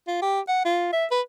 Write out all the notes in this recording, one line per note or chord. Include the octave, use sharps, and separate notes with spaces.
F4
G4
F#5
F4
E5
B4